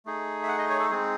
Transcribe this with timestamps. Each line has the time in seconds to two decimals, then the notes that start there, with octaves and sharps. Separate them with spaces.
0.06 A3 D#4 G#4
0.43 E5
0.48 F#5
0.58 D#5
0.70 C#5
0.79 A4
0.90 G#3 C4 D#4 G#4